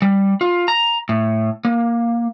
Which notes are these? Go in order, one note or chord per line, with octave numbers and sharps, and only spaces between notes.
G3
F4
A#5
A2
A#3